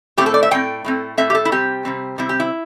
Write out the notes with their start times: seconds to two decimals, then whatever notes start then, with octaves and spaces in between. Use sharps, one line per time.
0.17 A2 A3 C4 G4
0.26 A4
0.34 D5
0.43 E5
0.51 A2 A3 C4 G5
0.84 A2 A3 C4
1.17 A2 A3 C4 E5
1.30 G4
1.35 A4
1.45 E4
1.52 C3 G3 C4 G4
1.85 C3 G3 C4
2.18 C3 G3 C4 E4
2.29 G4
2.40 E4